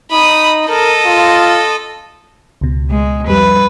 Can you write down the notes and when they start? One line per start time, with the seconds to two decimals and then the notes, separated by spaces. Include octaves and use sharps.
0.12 D#4 B5 D#6
0.69 A4 A#4 D#5
1.06 F4
2.61 C#2 B2
2.90 G#3
3.28 F2 G3 B4